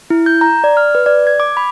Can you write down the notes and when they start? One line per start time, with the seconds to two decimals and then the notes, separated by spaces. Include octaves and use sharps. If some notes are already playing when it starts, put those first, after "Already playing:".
0.10 E4
0.26 G6
0.41 A#5
0.64 D5
0.77 F6
0.95 B4
1.06 D5
1.27 G#6
1.40 D6
1.57 B5